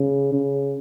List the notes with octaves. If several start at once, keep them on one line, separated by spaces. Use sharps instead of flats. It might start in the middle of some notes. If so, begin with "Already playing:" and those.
Already playing: C#3
C#3